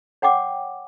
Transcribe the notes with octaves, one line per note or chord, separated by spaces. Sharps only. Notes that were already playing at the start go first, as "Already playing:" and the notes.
C#5 F#5 G5 D6